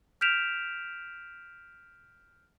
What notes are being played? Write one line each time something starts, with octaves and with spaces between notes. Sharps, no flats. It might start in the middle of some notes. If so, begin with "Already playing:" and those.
F6 G6 B6 D7 E7 F7